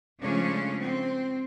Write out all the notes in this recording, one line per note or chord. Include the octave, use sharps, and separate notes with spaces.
C#3 F3 G#3 A3 C#4 D4
C4